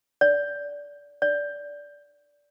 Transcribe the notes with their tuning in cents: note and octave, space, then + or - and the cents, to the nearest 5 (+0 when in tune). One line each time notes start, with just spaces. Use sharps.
D5 -20
D5 -15